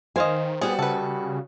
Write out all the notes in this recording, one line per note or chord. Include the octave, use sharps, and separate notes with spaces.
D#3 C5 D#5 F5 G#5
G3 B3 F#4 G#4
C#3 A4 B4